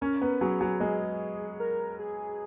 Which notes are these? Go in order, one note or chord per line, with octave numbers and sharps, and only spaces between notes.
C#4 A#4
B3
F#3 G#4
F#3
G#3 G#4
A#4
G#4